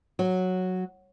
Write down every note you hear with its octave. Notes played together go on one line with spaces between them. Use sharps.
F#3